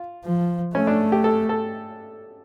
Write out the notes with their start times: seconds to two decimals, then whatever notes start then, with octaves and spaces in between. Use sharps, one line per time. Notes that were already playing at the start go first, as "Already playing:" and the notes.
Already playing: F4
0.25 F3
0.75 A3 C#4
0.87 D4
1.12 G4
1.24 A4
1.49 A4